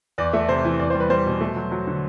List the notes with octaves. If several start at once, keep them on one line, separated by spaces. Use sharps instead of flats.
E2 D5
A3 E5
C3 C5
E3
E2 D5
C5
G3
B4
G3 C5
B2
A3
F#3
F#3
D3